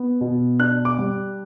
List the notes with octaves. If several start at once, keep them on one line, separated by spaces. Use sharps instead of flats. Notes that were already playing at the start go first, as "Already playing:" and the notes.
Already playing: B3
B2
D4 F#6
D6
G3